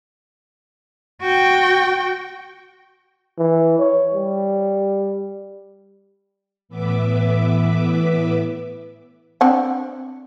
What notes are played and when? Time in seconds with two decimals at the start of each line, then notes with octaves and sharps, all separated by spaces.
1.21 F#4 G5
3.38 E3
3.79 C#5
4.14 G3
6.69 A2 E3 B3 B4 E5 D6
9.41 C4 D4 F#5